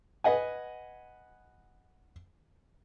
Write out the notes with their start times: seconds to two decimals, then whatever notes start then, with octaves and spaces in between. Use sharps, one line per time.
0.24 B4 D#5 F#5 G#5